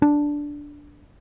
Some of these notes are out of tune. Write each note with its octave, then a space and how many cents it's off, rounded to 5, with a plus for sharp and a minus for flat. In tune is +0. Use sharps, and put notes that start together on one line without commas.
D4 -5